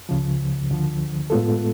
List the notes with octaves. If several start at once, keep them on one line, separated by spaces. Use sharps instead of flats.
C#2 C#3 F3
D2 D3 F3
A2 G#3 B3 F4 A4